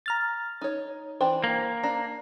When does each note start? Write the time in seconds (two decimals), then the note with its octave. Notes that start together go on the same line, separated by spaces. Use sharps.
0.06 A#5 F6 A6
0.61 D#4 C#5
1.21 E3 D4 C5 G5
1.44 A#3
1.84 D4 A#5